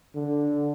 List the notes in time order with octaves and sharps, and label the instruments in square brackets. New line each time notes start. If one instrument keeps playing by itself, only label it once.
[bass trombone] D3